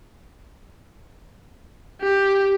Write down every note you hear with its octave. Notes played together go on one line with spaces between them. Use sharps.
G4